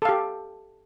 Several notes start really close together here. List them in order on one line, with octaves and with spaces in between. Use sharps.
A4 F5 G4